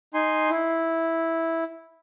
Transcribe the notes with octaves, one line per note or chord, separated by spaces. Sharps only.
D#4 G#5 C6
E4